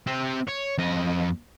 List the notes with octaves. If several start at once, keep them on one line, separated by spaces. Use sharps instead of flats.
C4 G4
C#5
F2 D#5